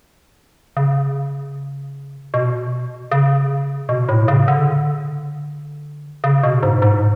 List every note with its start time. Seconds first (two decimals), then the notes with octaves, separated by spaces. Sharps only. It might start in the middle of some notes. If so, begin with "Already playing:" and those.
0.77 C#3
2.34 B2
3.12 C#3
3.89 B2
4.09 A2
4.28 C#3
4.48 D3
6.24 C#3
6.43 B2
6.63 G#2
6.82 G#2